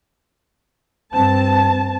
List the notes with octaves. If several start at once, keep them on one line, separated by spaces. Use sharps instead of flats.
G2 C4 A5